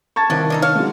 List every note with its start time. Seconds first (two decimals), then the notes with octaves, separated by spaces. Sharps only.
0.16 A5 C#6 G#6 A6
0.30 C2 D#3 F3 F#3 D4
0.50 D4 D#4 A4
0.62 A4 C#5 F5
0.75 F#3 G#3